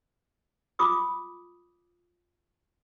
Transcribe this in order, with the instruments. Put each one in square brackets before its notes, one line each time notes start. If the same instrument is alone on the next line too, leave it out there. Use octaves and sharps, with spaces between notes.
[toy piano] F4 D6 D#6